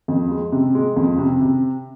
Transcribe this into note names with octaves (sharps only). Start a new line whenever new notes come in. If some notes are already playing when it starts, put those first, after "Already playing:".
F2
G#3
C3
G#3
F2
C3
C3